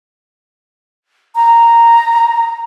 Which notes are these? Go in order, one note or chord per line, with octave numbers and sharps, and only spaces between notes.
A#5